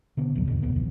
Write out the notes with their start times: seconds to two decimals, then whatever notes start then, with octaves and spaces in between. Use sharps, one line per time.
0.17 B2 D3 B3
0.35 A1 D#2 F#3
0.47 E2 G#2 B2 D3
0.62 C#2 A#2 A#3 B3
0.76 A1 F2 D#3